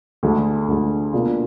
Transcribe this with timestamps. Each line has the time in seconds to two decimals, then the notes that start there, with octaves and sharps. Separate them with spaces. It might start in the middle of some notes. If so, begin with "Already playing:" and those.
0.23 D2 D3 G#3
0.68 D2 D3 G#3
1.13 B2 A#3 D4 F4 G#4